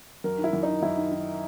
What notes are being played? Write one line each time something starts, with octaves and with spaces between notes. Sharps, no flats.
F#2 A#4
D#3
E4
F#2
D#4
D#3
F#2 E4
D#3
D#3